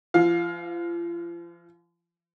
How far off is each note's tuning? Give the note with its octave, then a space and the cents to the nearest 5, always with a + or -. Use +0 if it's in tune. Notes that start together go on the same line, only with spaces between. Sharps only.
F3 -35 F5 +20